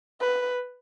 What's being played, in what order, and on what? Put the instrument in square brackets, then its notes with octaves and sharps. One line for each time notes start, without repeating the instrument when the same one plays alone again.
[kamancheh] B4